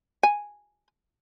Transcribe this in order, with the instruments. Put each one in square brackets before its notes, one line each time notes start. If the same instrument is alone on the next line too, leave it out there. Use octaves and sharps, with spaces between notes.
[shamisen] G#5